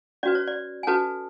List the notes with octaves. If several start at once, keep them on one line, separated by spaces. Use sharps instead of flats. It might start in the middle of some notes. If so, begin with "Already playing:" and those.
C#4 F#4 B4 D5
C#5
D5
G#5
C#4 F#4 A4 B4 A5